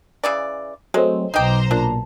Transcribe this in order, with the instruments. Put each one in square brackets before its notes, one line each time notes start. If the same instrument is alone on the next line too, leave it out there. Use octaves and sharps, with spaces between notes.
[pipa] C#3 E3 D5
[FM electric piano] F#3 A3 C4 [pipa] G#3
[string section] B1 C5 A#5 [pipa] D#4 G5 [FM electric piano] D6 G6 C7
[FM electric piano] A#2 [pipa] D4